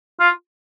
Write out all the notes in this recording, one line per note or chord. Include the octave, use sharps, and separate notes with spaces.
F4